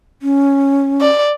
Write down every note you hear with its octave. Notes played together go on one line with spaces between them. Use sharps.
C#4
D5